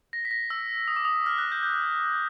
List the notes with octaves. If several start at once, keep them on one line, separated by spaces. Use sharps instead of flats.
A#6
B6
A#6
E6
D#6
D6
D#6
F6
F#6
G6
G6